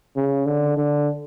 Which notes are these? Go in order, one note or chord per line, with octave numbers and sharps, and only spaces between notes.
C#3
D3
D3